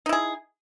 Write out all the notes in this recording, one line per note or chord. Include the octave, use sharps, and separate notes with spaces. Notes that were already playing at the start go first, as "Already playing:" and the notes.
D#4 E4 G#4